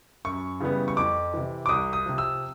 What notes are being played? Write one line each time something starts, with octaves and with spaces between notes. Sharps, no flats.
F#2 C#6
C#3 E3 G3 B3
C#6
F2 D6
C3 E3
D6
C2 D#6
D#6
C3 F3
E6